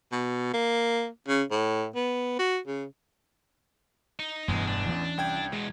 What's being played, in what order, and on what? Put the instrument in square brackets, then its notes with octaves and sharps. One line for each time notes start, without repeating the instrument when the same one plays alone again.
[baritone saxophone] B2
A#3
C#3
A2
B3
F#4
C#3
[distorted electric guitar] D#4
[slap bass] E1 G2 [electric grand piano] A1 E2 [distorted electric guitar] G#3
[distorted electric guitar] D4
[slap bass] E3 C#4
[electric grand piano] C2 G5 G#6
[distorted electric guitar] E2 B2 [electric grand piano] G#3